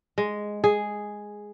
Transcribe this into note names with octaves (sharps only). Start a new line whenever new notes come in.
G#3
G#4